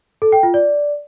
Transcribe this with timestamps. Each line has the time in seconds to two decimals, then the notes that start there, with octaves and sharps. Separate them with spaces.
0.22 A4
0.32 G5
0.43 F4
0.54 D5